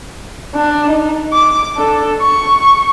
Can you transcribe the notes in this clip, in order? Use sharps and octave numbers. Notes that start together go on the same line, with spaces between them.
D4
D#4
D6
D4 A4
C#6